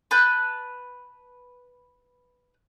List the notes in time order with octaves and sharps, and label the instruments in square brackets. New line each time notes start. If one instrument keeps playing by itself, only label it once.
[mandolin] B4 A5 F#6 G6